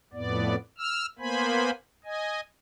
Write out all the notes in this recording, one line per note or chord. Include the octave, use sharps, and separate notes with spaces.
F2 A2 B3 D5
E6 F6
A#3 B3 C5 G#5 B5
D#5 G#5